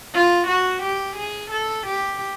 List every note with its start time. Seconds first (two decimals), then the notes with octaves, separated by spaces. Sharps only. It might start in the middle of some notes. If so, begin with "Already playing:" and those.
0.13 F4
0.47 F#4
0.83 G4
1.16 G#4
1.51 A4
1.87 G4